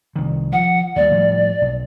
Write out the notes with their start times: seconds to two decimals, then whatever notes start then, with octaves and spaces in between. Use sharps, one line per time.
0.16 C2 D#3
0.53 F3 F#5
0.96 D#2 G3 D5
1.11 A2 F3 G3
1.62 B1